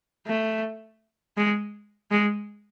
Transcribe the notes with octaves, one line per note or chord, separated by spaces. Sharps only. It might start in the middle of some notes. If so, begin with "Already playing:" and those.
A3
G#3
G#3